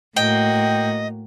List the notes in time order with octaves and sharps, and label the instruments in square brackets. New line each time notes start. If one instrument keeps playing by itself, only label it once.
[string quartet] A2 A#3 F#4 [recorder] D#5 [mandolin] G5